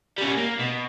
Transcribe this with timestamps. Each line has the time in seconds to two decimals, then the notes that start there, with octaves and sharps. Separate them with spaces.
0.18 G3 C#4
0.37 A#3
0.60 B2